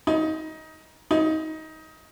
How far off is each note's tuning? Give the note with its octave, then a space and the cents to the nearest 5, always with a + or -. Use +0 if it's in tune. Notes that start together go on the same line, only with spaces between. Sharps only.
D#4 +20
D#4 +20